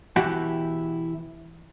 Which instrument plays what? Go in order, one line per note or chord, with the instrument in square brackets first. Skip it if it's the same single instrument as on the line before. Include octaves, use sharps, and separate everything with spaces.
[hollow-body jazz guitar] B2 E3 E4 F#4 G4